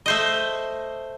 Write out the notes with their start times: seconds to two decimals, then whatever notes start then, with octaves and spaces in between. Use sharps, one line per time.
0.06 A3 C5 D#5